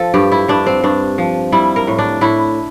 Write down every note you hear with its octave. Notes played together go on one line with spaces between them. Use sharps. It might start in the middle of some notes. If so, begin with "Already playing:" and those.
Already playing: F3 A4
G2 G4
E4
G2 D4
C4
G2 D4
F3
G3 E4
A#4
A2
D4
A2 E4